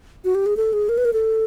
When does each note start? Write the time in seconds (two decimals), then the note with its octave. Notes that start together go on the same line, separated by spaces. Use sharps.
0.24 F#4
0.35 G4
0.46 G#4
0.57 A4
0.73 G#4
0.89 A#4
0.98 B4
1.05 A#4
1.13 A4